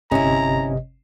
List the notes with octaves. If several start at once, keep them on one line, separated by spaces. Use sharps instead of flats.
G1 C3 C#4 E4 D#5 A#5